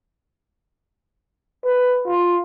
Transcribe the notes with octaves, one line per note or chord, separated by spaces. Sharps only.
B4
F4